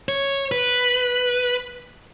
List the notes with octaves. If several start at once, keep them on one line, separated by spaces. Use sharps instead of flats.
C#5
B4